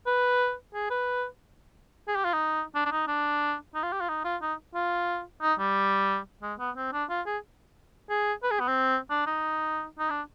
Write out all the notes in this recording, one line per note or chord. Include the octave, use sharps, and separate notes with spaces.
B4
G#4
B4
G#4
G4
F4
D#4
D4
D4
D#4
D4
D#4
F4
G4
F4
D#4
F4
D#4
F4
D#4
G3
G#3
B3
C4
D4
F4
G#4
G#4
B4
G#4
B3
C4
D4
D#4
D#4
D4